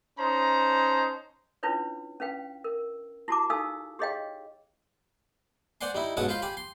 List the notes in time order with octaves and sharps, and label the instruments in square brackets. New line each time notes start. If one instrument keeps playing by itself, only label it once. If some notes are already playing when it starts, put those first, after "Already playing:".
[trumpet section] C#4 D#4 C5 A5 A#5
[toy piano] C#4 D4 E4 F4 B4 C#5
C#4 B4 F5 G5
A#4
E4 F#4 G4 A5 A#5 D6
D#4 G4 A4 F5 G#5 E6
G4 G#4 C#5 D#5 F5 G5
[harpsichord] C5 D5 F#5 G#5 C6
G3 D#4 E4
B1 G#2 C#4 F#5 A5 D#6
F4 C5 B5 C6
G4 G#5 B5
C6